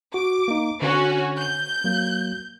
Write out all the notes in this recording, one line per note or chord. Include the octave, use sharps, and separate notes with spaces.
F#4 D6
A#3 D#4
D3 C#4 F#4
G6
F#3 A#3